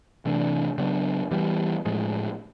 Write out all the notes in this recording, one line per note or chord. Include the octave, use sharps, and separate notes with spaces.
C3 E3 A3 D4
C#3 F#3 B3 D4
E3 G3 B3
A2 F3 G#3